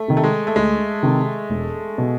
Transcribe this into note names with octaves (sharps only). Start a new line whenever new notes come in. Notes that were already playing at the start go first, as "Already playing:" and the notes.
Already playing: A3
C3 D#3
A3
G#3
A3
D2 G#3
C3 D#3
E1
B2